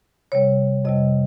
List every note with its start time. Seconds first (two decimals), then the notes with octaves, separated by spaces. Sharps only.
0.32 C3 G3 C#5
0.85 F2 C3 G3 D#5